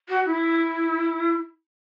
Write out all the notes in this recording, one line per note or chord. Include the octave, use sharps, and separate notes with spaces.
F#4
E4